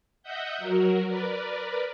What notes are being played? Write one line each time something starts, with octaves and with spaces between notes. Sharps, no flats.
D#5 E5 F#5 G6
F#3 F#4 A#4
A#4 B4 D5